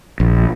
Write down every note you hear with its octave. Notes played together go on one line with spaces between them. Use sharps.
A#1